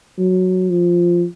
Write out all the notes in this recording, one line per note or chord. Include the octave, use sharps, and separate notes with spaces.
F#3
F3